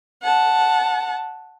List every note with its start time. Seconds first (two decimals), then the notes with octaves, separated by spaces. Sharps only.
0.22 F#5 A5